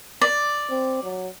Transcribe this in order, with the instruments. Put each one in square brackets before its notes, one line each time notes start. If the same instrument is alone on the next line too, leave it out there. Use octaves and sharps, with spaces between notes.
[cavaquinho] D5
[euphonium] C4
F#3